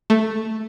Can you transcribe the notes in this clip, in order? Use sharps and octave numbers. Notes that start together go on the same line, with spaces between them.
A3